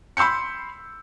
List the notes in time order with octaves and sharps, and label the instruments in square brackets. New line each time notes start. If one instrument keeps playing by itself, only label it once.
[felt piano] B5 C6 E6 G6 C#7